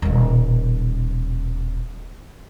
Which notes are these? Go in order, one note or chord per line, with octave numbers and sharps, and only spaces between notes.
D#1 B2